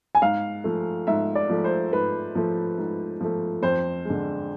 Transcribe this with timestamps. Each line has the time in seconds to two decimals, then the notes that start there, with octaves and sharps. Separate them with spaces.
0.15 G#5
0.22 G#2 F5
0.64 F3 A3
1.07 G#2 E5
1.35 D5
1.49 F3 A3
1.64 C5
1.92 G#2 B4
2.35 F3 A3
2.78 G#2
3.20 F3 A3
3.63 F2 C5
4.05 D3 G#3